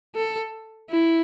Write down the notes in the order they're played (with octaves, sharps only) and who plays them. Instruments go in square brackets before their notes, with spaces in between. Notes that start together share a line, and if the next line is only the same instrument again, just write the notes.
[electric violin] A4
E4